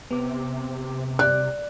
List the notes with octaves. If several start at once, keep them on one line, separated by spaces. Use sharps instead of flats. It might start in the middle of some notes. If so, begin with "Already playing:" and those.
C3 B3 D6
D5 F#6